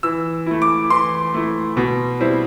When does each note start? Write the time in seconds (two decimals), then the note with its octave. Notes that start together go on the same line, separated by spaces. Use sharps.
0.03 E3 E6
0.46 A3 E4
0.62 D6
0.90 E3 C6
1.34 A3 E4
1.77 B2
2.20 G3 C4 E4